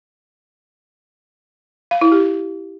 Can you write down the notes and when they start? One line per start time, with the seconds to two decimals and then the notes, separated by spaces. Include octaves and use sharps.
1.91 F5
2.01 E4
2.12 G4